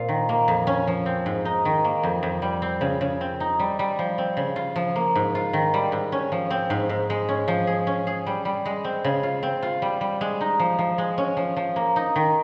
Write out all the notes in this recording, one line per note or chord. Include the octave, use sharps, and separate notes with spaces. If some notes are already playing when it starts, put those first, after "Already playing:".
Already playing: A#2 C4 F4
D#3
A#3
F2
C#4
F3
C4
G#2
D#4
D#3
A#3
F2
F2
G3
C4
C#3
C#3
C4
D#4
G3
G3
F3
C4
C#3
F4
F3
A#3
G#2
F4
D#3
G3
G#2
C#4
F3
C4
G#2
G#2
G#3
C#4
F3
G#4
C#4
G#4
G3
G3
G#3
C4
C#3
F4
C4
F4
G3
G3
G#3
D#4
F3
F3
G#3
C#4
F3
F3
A#3
D#4
D#3